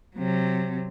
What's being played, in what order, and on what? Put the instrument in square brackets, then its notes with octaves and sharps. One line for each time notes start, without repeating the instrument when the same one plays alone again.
[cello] C3 F#3